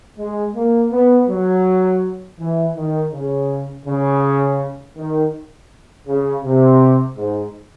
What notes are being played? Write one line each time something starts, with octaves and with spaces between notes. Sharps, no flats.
G#3
A#3
B3
F#3
E3
D#3
C#3
C#3
D#3
C#3
C3
G#2